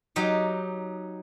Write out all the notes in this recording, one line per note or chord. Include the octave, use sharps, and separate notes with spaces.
F#3 D#4 G4